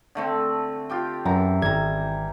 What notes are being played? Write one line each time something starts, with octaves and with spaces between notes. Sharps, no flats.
D3 A3 C4
F4 G4 G5
F#2 E3 A#5
G#1 G3 A#5 G#6